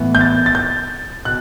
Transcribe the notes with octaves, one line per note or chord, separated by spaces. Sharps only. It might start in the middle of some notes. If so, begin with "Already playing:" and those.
Already playing: A2 E3 B3
G6
A6
A6
G6
B2 F#6